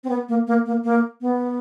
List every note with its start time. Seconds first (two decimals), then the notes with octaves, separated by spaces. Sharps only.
0.04 C4
0.09 B3
0.28 A#3
0.47 A#3
0.66 A#3
0.84 A#3
1.21 B3